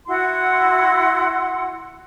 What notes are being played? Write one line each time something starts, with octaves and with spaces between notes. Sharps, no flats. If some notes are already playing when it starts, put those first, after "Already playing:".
E4 F#4 F#5 C6